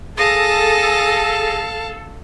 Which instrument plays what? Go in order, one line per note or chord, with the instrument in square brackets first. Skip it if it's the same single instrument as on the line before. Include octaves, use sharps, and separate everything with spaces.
[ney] G#4 [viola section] A4 [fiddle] F5 A5 [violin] D#6 A#6